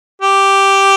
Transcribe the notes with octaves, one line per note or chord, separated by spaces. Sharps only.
G4